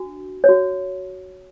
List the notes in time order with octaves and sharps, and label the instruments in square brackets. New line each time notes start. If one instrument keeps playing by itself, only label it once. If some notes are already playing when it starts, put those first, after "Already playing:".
Already playing: [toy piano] D4 F#4
C#5
F#4